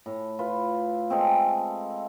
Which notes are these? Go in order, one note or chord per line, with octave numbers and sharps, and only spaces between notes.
A2
F4 B4
G#3 A3 C4